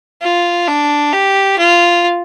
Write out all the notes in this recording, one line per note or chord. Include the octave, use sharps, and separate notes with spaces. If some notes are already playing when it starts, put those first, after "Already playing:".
F4
D4
G4
F4